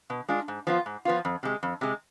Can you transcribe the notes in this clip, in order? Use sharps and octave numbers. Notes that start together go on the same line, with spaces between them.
B2
G#3 D4 F4
G#2
F3 B3 F4
G#2
F3 B3 F4
F2
C3 G#3
F2
C3 G#3